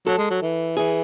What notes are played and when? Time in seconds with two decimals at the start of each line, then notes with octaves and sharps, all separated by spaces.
0.07 F#3 A4
0.18 G#3
0.31 F#3
0.42 E3
0.77 E3 G#4